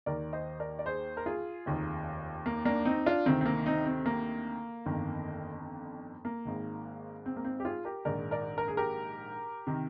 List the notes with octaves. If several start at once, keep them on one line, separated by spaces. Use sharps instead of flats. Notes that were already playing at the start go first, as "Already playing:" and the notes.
D#2 D#3 A#4 D5
C5 D#5
A#4 D5
D5
G#4 C5
A#4
F4 G#4
F1 D#2 D#3
A#3
A#3 D4
C4 D#4
D4 F4
D2 C3 D#3 C4
C4
A#3
C4 D#4
C4
A#3
G1 F2 D#3
A#3
G#1 G#2 D#3
C4
A#3
C4
G4
F4 G#4
G4 A#4
A#1 G#2 D#3 A#4 D5
A#4 D5
A#4
G#4
G4 A#4
C3 D#3